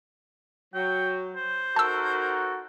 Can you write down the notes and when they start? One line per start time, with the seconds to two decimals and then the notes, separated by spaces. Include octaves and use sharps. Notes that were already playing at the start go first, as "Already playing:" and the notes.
0.74 F#3 G5
1.36 C5
1.76 D#4 F#4 A4 A#4 A5 E6